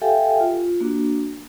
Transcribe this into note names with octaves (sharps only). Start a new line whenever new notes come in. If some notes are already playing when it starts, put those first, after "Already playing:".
G4 A4 E5 F5 G5 G#5
F4
A#3 D4 F#4